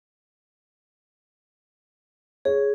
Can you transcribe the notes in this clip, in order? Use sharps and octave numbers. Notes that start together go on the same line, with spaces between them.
G#4 C#5